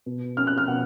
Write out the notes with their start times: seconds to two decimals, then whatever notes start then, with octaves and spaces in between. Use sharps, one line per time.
0.06 B2
0.37 C#4 F6
0.47 F#6
0.58 F6
0.68 B2 F#5